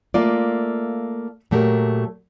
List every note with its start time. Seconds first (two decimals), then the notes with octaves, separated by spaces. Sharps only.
0.14 A3 A#3 F4 D5
1.51 A#2 F#3 A3 G4 A#4